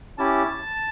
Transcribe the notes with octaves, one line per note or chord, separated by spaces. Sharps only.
C#4 E4 G4 A5